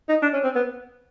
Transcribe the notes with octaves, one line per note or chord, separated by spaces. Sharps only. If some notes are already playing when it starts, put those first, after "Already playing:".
D#4
D4
C#4
C4
B3